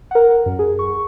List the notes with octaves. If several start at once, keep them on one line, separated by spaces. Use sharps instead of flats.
A#4 F#5
F#2
G#4
C#6